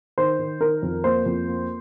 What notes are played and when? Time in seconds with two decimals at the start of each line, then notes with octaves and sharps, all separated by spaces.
0.18 D#3 C5
0.39 D#3
0.61 D#3 A#4
0.83 F2
1.04 A#3 C5
1.26 F2
1.47 A#3